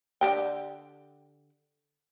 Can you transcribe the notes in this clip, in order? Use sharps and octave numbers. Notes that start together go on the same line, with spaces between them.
D3 G4 G5